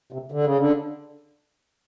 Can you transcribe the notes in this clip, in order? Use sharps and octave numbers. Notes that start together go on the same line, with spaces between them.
C3
D3
C#3
D3